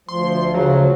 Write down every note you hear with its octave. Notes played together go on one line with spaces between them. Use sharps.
D2 F3 C6
C#3 F#3